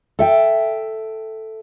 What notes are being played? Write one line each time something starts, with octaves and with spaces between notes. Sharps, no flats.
A4 E5 G5